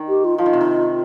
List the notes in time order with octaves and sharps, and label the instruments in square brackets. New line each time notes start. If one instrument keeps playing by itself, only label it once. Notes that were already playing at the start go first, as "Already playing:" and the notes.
Already playing: [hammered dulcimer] D#3
[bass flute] G4
F4
[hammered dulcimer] F3 [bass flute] F4
[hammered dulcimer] D#3
C3
D#3